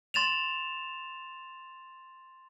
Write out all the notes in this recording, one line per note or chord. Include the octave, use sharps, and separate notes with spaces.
C6 A6 E7 F7